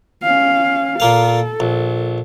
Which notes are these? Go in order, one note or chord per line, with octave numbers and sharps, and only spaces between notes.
C#4 F5
A#2 A#3 A4 F5
A#1